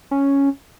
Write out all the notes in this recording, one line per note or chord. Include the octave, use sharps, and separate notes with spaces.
C#4